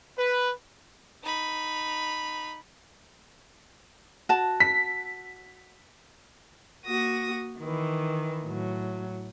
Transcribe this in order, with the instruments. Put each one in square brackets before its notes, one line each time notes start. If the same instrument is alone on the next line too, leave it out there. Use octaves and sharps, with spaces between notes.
[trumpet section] B4
[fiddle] D#4 B5
[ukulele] F#4 A5
[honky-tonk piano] B6
[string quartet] A#3 F#4 D#6 A#6
D#3 E3
A2 F#3